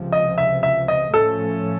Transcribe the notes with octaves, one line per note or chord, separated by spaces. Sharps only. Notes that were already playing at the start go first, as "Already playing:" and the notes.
Already playing: C#2 C3 F3
D#5
E5
E5
D#5
A2 F3 A3 C#4 A4